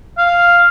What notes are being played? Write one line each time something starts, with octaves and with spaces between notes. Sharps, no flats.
F5